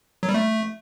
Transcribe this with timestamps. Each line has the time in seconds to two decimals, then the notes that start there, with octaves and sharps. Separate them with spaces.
0.23 F#3
0.29 G3
0.34 A3